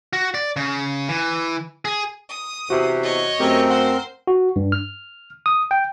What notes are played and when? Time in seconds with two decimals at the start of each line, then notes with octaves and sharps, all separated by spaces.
0.13 F#4
0.34 D5
0.56 C#3
1.08 E3
1.85 G#4
2.30 D#6
2.70 E2 C3 F#4
3.03 C#5 D#5
3.40 F#2 A3 C4 G4 A#4
3.70 C5 F#5 C6
4.27 F#4
4.56 G2
4.72 F6
5.46 D#6
5.71 G5